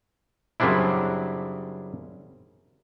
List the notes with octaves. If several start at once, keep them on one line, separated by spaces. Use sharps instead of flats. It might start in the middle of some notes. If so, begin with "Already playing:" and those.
F#2 C#3 G3 C4 D4 E4